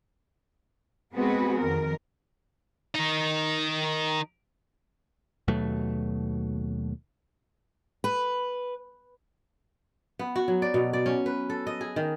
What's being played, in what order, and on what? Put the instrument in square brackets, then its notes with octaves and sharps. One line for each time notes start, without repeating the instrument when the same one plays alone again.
[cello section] G#3 B3 C4 F#4 G#4 B4
F2 D#3 A#4
[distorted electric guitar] D#3 D#4
[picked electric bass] D#2 B2 F#3 A3
[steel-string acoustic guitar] B4
[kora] B3
F#4
F#3
D5
B2
D5
C#4
B4
A4
D#5
G#4
D#3